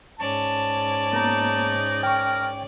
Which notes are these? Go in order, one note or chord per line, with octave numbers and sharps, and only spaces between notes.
G#2 C#4 D5 A5
A#3 B3 D#4 A#5
A#4 G5 C#6